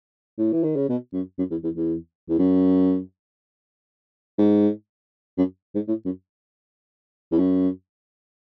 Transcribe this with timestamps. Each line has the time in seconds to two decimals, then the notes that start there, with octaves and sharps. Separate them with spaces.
0.38 A2
0.53 E3
0.64 D#3
0.76 C#3
0.89 B2
1.13 F#2
1.39 F#2
1.51 E2
1.64 E2
1.76 E2
2.29 E2
2.39 F#2
4.39 G#2
5.38 F#2
5.75 G#2
5.88 A2
6.05 F#2
7.32 E2
7.38 F#2